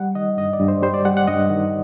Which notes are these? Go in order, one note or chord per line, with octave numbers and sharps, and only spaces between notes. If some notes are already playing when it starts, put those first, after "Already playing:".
Already playing: G3 F#5
D#3 D#5
G2 D#5
D5
G2
C5
G3 C5
D5
G3 F#5
F#5
G2 D#5
D#3